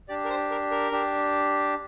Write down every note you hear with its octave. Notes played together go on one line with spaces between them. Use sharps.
D4 G4 D5
A#4
C5
A#4
A#4
D4 G4